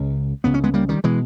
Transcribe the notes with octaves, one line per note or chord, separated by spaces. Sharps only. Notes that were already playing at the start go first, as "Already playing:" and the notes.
Already playing: C#2 C#3
C#2 C#3 B3
C#4
G#3 B3
G3 A#3
D#3 G3
B2 E3 G#3